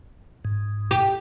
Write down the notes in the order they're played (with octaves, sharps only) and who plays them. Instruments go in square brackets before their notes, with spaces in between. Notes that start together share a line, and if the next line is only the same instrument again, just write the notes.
[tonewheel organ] G#2
[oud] G4